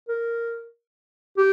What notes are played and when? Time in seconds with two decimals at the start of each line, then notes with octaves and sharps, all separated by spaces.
0.08 A#4
1.37 G4